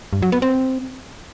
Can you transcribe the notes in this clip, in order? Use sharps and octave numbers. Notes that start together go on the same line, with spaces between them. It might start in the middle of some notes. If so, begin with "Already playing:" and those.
G2
F#3
B3
C4